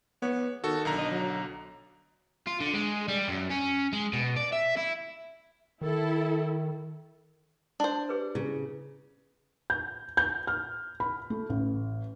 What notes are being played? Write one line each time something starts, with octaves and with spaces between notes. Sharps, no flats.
B3 C#5
D#3 F#4 A4
B1 D3 A#5
D#5
F#3
F4
D3
G#3
G3
F#2
C#4
G#3
B2
D5
E5
E4
D#3 E4 A4
D4 C5
G4 G#4 B4
C#3 E4
G6
G6
F6
B5
A3
A1